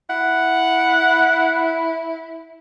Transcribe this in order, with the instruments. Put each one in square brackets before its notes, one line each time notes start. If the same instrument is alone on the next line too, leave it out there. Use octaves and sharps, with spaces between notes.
[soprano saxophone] E4 [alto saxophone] F#5